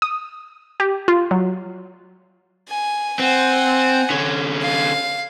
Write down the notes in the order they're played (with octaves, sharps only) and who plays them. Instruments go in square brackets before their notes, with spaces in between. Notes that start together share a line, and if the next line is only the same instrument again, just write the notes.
[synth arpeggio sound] D#6
G4
F4
F#3
[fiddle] G#5
[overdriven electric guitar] C4 [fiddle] F#5 G#5
[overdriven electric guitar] D3 C#4
[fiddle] F5